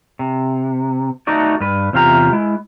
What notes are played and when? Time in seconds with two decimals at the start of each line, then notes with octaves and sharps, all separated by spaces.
0.19 C3
1.27 A3 D#4 F#4 D5
1.60 G2 B4
1.93 E2 C3 F4 G4 A#5
2.33 G#3 E4